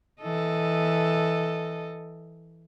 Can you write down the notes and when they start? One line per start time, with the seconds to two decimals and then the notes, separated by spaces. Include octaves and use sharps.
0.22 E3 A4 D#5